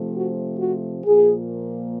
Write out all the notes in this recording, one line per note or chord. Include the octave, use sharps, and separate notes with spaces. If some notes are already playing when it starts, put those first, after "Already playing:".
Already playing: C3 F3 A3
F#4
F#4
A#2 F3 A#3 G#4